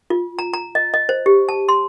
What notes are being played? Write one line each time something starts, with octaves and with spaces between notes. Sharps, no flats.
F4
A#5
A#5
D#5
D#5
C5
G4
A5
C6